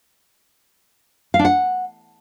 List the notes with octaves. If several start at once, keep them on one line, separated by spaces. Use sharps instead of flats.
F5
D4
F#5